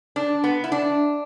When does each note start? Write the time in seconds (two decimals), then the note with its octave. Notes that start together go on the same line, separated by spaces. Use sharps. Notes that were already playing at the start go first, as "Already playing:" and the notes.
0.16 D4
0.44 B3
0.64 E4
0.72 D4